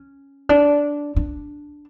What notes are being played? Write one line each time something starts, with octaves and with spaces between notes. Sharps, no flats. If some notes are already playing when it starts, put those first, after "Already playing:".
Already playing: C#4
D4
D4